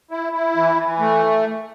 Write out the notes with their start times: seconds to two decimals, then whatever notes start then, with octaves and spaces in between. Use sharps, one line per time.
0.11 E4
0.33 E4
0.55 E3
0.76 E3
0.99 A3